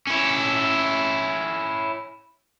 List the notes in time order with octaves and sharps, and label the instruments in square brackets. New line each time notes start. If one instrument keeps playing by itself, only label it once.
[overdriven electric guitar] C#4 E4